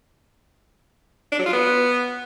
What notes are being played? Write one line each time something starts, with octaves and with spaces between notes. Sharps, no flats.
D4
F#3
F4
B3